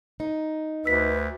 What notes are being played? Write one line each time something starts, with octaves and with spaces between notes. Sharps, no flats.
D#4
D2 B4 E6 B6